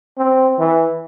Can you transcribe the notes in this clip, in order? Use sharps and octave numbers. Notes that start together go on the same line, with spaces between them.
C4
E3